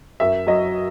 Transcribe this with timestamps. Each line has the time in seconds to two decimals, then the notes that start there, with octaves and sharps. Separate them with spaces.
0.20 F#2 E5
0.47 F#3 D#5